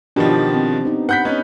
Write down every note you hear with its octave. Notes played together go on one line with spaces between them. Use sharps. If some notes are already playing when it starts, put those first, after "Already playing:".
B2 D#3 F3 D4 G4
C4
B3 D#4
B4 F#5 G6 B6
B3 C#4 D#4